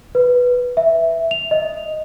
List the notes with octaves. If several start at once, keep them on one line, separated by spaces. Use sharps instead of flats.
B4
E5
F7
D#5